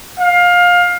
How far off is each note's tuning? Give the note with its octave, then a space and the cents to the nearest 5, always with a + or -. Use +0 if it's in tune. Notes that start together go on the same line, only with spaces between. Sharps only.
F5 +20